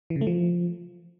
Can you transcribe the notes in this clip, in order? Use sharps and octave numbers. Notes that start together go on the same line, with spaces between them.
E3
C#3
A3
F3